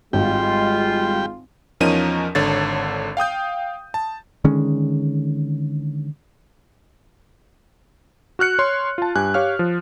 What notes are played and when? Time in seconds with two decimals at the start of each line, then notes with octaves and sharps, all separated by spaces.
0.13 G#1 G3 G#3 F4 G5
1.80 E2 F3 C#4 D#4 A#4 D#7
2.35 G#1 D3 C#5 A6
3.17 F5 G5 D#6 G6
3.94 A5
4.44 D3 D#3 G#3 C#4
8.39 F#4 F6 F#6 C#7
8.59 C#5 C6
8.98 F4 A5
9.15 G2 G4 G#5 F#6
9.34 G4 C#5 F5 F6
9.59 F3